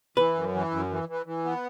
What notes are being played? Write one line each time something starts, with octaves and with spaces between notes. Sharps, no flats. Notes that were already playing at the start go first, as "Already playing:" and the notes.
E3 B4
F#2
E3
F#2
E3
E3
E3
B3